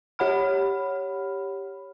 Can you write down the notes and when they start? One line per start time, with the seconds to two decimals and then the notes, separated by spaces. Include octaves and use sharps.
0.19 G4 C#5 F#5 B5 F6